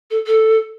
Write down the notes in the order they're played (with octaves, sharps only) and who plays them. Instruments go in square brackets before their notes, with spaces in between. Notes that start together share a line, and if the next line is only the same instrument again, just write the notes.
[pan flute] A4
A4